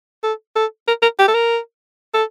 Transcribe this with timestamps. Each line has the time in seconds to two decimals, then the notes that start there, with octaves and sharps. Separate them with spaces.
0.23 A4
0.56 A4
0.87 A#4
1.02 A#4
1.19 G4
1.28 A4
1.34 A#4
2.14 A4